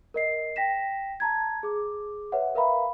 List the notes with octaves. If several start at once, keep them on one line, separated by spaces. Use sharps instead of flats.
A#4 D#5 C7
G5 A#6 B6 E7
A5 A#5 G#6
G#4 D6
B4 C#5 E5 F#5
A#4 B4 E5 F5 A#5 B5